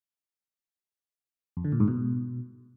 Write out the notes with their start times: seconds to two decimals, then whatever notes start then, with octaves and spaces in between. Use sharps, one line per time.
1.57 F2
1.65 D3
1.72 A#2
1.80 G#2
1.88 B2